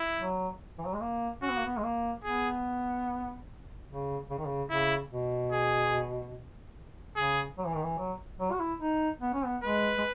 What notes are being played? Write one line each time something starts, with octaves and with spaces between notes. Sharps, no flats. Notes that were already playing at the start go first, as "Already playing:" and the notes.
Already playing: E4
F#3
E3
F#3
G#3
A#3
C#4 F#4
B3
A#3
B3
G#3
A#3
B3 G#4
C#3
C#3
D#3
C#3
C#3 E4
B2
G#4
C#3 G#4
F#3
E3
D#3
E3
F#3
F#3
F#4
E4
D#4
B3
C#4
B3
G#3 B4
G#3